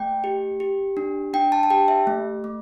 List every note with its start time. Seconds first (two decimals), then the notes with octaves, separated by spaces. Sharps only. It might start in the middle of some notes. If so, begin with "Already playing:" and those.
Already playing: A3 G5
0.24 G4
0.60 G4
0.97 D4
1.34 D4 G5
1.52 A5
1.63 A5
1.70 G4 G5
1.88 E5
2.07 A3
2.44 A3